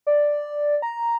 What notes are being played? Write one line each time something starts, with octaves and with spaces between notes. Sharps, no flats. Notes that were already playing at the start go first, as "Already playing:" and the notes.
D5
A#5